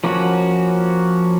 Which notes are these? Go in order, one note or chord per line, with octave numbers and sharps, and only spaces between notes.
F3 A#3 C#4 F#4